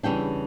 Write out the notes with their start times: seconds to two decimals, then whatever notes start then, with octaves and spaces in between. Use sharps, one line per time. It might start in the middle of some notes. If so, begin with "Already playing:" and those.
0.03 E2 C#3 E3 G3 D4 G5